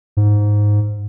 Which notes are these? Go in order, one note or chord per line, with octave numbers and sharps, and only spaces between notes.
G#2